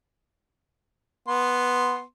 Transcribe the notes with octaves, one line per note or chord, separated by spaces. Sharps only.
B3 C6